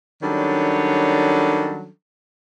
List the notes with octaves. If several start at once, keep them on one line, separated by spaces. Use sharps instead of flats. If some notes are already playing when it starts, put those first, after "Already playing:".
D#3 F#3 G3 C#4 D4 A4